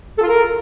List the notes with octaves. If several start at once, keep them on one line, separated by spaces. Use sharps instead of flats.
A4
F4
A#4